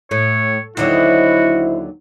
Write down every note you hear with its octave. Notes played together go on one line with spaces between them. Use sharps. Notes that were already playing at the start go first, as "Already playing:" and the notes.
A2 C#5
D#2 D3 F#3 E4 F#4 C5 D#5